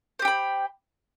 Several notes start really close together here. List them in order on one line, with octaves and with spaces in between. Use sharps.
C5 G4 G5 B5